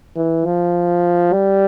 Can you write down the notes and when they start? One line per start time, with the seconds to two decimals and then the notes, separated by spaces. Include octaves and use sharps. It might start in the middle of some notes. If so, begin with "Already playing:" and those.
0.16 E3
0.46 F3
1.33 G3